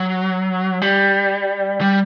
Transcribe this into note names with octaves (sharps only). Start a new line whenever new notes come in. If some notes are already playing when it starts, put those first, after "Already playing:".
Already playing: F#3
G3
G3